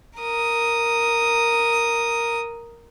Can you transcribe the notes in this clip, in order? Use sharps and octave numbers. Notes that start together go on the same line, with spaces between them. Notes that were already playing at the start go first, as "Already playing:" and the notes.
A#4 D#6